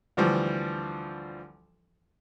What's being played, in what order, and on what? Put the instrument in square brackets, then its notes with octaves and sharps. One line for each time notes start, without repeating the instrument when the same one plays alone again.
[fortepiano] D2 E3 F3 G3